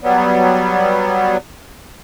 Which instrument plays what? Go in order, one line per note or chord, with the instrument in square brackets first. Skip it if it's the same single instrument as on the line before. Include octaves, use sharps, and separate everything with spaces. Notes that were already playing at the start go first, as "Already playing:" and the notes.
[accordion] F#3 G3 B3